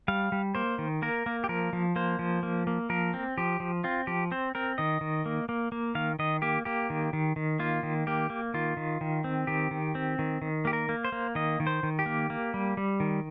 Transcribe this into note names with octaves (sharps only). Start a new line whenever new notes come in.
G3 F5
G3
A#3 C5
D#3
A#3 A#4
A#3
G4
F3 A#4
F3
A#3 C5
F3
A#3
A#3
F3 A#4
C4
F3 G4
F3
C4 F4
F3 G4
C4 C5
C4 A#4
D#3 D#5
D#3
A#3
A#3
A#3
D#3 F5
D#3 D#5
A#3 G4
A#3 G4
D#3
D#3
D#3
A#3 F4
D#3
A#3 G4
A#3
D#3 F4
D#3
D#3
C4
D#3 G4
D#3
C4
D#3
D#3
A#3 G4
A#4
A#3
C5
A#3
D#3 D#5
D#3
C5
D#3
G4
A#3
A#3
G3
G3
D#3